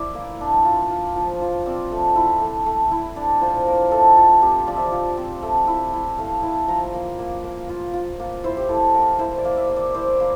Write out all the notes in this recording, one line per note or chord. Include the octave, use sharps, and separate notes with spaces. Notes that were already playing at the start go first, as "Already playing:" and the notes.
Already playing: E4 D5 E5
A#3
D4
F4
F4
F3
F4
C4 D5
A3
E4
A3
A3
E4
D4 D5
F4 C5
A#3 A#4
A3 A4
F4 A4
C4 G4
F3 D5
E5
D5
F3
C4
A3
E4
E4
A3 F5
E4 A5
F3 A#5
C6
A#5
A#3
A#3
A#3
F4
F4
A#3
E4 C5
G4
E4 A4
A#3 A#4
E4 C5
D5
A#3
E5
A#3 E5
D5
E4 C5
A#3